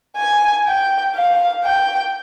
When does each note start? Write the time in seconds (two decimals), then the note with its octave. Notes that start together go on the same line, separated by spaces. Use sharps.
0.16 G#5
0.66 G5
1.15 F5
1.64 G5